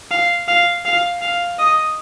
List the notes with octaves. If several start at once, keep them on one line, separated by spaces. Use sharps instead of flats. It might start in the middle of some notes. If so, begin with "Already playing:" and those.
F5
F5
F5
F5
D#5